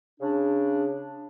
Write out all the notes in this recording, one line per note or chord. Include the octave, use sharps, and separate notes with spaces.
C#3 D4